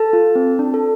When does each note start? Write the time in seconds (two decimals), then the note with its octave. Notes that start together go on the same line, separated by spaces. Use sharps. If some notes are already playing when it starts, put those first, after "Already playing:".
Already playing: A4 A5
0.13 F4
0.35 C4
0.59 D4
0.74 A4